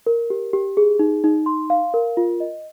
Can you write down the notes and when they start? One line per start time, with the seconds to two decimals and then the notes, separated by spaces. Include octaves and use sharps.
0.06 A#4
0.30 G4
0.53 G4
0.77 G#4
0.99 D#4
1.24 D#4
1.46 C6
1.70 F5
1.94 A#4
2.17 F4
2.40 D#5